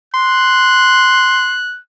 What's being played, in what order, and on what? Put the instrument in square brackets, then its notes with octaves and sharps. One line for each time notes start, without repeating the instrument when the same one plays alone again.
[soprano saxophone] C6 [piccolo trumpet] F#6